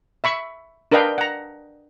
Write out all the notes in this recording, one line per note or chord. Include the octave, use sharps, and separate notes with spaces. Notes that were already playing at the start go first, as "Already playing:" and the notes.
E5 B5 C#6
D4 A#4 B4 D#5 F5 G5
F#5 A#5